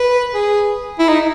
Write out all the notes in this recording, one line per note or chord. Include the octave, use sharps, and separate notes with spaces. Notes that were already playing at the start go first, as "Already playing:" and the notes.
Already playing: B4
G#4
E4
D#4